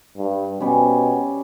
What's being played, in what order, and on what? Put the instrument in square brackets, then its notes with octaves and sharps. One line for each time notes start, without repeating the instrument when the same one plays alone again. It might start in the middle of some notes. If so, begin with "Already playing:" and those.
[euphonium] G2
[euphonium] B2 [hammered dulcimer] G3 C#4